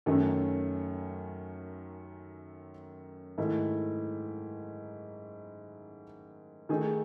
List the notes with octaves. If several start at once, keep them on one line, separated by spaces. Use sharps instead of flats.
F#2 D#3 A3 C#4
G#2 D#3 A3 E4
D#3 A3 D#4 G#4